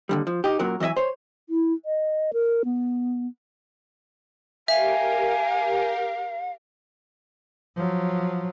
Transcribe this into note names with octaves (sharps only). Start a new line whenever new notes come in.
D#2 D3 G3
F3
D#4 G4
F#2 A#2 F#3 A#4
E3 F#3 D#5 E5 G#5
C5 C#5
E4
D#5
A#4
B3
G4 A#4 E5 F5 G#5
F3 F#3